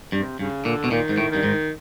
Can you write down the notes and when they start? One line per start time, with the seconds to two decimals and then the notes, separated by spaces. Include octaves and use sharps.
0.12 G2 C3
0.39 G2 C#3
0.65 A#2 D3
0.84 B2
0.91 A#2 D#3
1.09 G#2
1.18 A2
1.31 G2 D#3
1.43 G#2